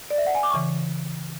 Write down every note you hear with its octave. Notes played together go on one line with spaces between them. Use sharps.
D5
E5
F#5
G#5
D6
C#6
C#3 E3